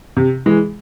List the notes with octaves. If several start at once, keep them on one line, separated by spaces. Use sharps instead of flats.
C3
E3 G#3